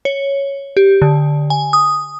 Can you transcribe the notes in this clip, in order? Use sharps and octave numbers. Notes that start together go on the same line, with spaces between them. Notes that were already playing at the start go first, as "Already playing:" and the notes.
C#5
G4
D3
G#5
D#6